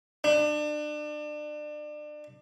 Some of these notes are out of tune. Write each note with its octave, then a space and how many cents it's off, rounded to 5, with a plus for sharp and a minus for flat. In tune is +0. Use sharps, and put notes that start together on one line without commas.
D4 +30